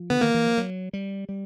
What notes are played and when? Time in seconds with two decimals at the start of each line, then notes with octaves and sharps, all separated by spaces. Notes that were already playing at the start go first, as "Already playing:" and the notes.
Already playing: F3
0.10 D3 B3
0.21 D#3 A#3
0.34 E3
0.46 F3
0.57 F#3
0.93 G3
1.29 G3